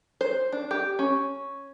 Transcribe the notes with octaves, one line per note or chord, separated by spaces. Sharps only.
C5
D4
G4
C#4